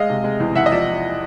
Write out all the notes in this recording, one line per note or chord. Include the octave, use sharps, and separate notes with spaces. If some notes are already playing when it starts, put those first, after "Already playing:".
Already playing: G#3 D#5 F5
C3
G#3
E2
E2 E5 F#5
D#5
F3 D5 E5